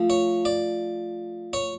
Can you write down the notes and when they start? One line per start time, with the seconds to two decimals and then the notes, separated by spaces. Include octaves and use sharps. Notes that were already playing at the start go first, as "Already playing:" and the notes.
Already playing: F3 A3
0.10 C#5
0.45 D5
1.53 C#5